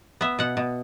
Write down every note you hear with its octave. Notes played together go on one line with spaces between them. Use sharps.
B3 E5
B2 F#5
B2